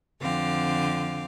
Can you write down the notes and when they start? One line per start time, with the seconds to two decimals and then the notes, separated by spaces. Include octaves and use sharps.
0.20 F2 D3 C4 F5 D6